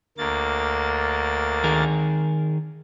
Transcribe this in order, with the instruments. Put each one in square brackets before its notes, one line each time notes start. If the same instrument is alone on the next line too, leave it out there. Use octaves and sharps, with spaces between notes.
[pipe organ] D2 A#3 A6
[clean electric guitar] D#3 G#4 A#4